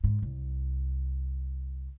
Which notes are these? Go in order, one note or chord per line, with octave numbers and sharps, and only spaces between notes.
G#2
C2